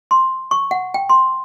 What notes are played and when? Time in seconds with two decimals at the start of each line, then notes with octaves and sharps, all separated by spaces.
0.11 C6
0.51 C#6
0.71 F#5
0.94 G5
1.09 C6